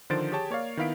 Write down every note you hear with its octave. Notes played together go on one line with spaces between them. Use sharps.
D3 D#3 F3 C5 A6 D7
G4 G#4 C#5 G5 A5
A#3 C#5 D5 F5
D#3 B3 E4 F5 B6 D7